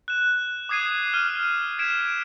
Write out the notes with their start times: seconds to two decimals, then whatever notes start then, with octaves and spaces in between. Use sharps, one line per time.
0.08 F#6 E7
0.69 D6 D#6 G#6 C7 D#7
1.14 F6 D#7
1.79 G#6 B6 D7 E7